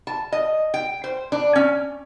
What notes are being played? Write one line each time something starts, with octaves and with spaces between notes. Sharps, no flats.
A5
D#5
G5
C5
D4
C#4